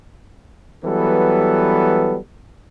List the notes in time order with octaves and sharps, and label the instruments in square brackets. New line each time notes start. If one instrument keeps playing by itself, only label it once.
[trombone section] E3 F#3 G3 B3 A4